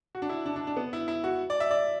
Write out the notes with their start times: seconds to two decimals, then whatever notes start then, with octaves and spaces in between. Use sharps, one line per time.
0.15 F#4
0.22 D4
0.29 E4
0.46 D4
0.56 D4
0.67 D4
0.77 B3
0.93 E4
1.08 E4
1.24 F#4
1.50 D5
1.60 E5
1.71 D5